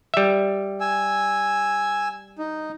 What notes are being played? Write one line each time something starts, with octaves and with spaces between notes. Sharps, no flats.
G3 E5
G#5 E6
D#4